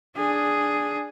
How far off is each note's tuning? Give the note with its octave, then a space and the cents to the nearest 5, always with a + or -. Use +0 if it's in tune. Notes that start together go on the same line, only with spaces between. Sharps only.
D4 +0 G#4 +0